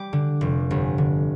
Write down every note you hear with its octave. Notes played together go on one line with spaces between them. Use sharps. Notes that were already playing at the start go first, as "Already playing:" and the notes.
Already playing: G3 D6
D3
F1
G1
D3